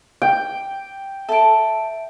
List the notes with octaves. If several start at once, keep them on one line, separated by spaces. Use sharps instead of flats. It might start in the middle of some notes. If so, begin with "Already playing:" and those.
G5
A4 E5 A5 D7